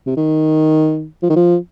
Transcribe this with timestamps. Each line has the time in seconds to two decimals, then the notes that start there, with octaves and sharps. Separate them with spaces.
0.06 C3
0.17 D#3
1.23 F3
1.30 D#3
1.36 F3